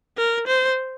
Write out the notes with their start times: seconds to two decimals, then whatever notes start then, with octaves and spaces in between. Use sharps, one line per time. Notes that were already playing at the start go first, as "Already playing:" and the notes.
0.18 A#4
0.47 C5